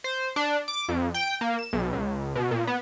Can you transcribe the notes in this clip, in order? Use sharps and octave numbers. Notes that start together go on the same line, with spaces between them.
C5
D4
D6
F2
G5
A#3
E7
B1
C#2
B2
A#2
B3